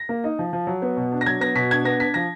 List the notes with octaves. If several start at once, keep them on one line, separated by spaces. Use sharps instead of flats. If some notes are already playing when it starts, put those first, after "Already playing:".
Already playing: A#6
A#3
D#4
F3
F3
F#3
B3
B2
D4
A#6
F#3 G#6
B3 A#6
B2 B6
D4 G#6
B3 A#6
D4 B6
F3 A#6